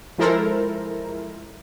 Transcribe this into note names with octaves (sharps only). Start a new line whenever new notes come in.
F3 G#3 E4 A4 A#4 C5